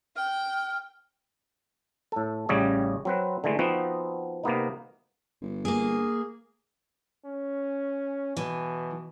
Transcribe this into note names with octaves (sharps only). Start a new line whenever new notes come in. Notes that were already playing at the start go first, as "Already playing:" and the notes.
G5 F6
A2 A4
A1 C#3 G3 C#5 D#5
F#3 C4 B4
D3 E3 G#3 A3
F3 B3 C4 D#4 F#4
C3 A#3 B3 D#4
G1
A#3 G#4
C#4
B2 E3